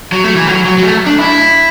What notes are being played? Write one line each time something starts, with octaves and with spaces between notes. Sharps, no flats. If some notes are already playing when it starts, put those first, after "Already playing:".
F#3
A3
E3
F#3
F#3
F#3
A3
D4
E4